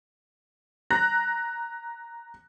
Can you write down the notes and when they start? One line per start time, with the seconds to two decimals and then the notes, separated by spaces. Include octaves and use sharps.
0.90 A#5 F#6 A#6